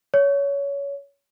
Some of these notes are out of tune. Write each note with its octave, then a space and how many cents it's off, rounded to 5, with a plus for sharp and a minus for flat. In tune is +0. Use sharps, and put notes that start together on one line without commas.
C#5 +20